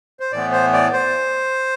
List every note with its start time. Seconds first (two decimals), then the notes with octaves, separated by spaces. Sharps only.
0.20 C5
0.32 A2 E3 B3 D5
0.52 C5
0.73 D5
0.93 C5